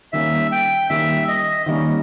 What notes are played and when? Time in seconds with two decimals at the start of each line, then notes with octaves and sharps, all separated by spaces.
0.13 D#3 G3 A#3 C#4 E5
0.52 G5
0.90 D#3 G3 A#3 C#4 E5
1.28 D#5
1.66 D#3 G3 A#3 C#4